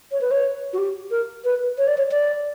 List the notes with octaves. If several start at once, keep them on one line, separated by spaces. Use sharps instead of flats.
C#5
B4
C#5
F#4
G4
A#4
B4
C#5
D5
C#5
D5